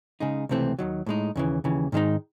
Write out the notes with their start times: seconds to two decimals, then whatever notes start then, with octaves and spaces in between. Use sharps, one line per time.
0.20 C#3 G#3 D#4
0.49 C#2 C3 E3 A3 C4
0.79 D#2 D#3 F#3
1.06 A2 G#3 D#4
1.36 D#2 C#3 E3
1.64 D#2 C#3 E3
1.92 G#2 D#3 G#3 D#4